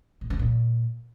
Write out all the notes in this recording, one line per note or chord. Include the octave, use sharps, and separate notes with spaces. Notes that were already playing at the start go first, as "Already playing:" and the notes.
B2
C#3
A#2